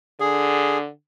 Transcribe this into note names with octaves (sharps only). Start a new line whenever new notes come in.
D3 G#4